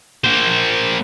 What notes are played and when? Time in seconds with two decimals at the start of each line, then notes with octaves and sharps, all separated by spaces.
0.24 A#3 C5